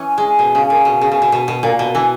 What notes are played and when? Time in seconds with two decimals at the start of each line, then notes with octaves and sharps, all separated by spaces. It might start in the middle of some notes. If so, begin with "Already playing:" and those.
Already playing: E3 C#4
0.18 G#3
0.39 B2
0.55 C#3
0.70 A#2
0.85 B2
1.01 C#3
1.12 B2
1.22 B2
1.32 B2
1.48 B2
1.63 A#2
1.79 B2
1.95 E3